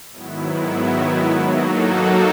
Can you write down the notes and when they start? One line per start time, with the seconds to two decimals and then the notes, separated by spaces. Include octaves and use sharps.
0.11 G#2 D#3 F#3 B3 E4
1.42 F#3 A#3 D#4 F#4 A4